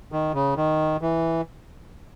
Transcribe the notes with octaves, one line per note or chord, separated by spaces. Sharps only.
D#3
C#3
D#3
E3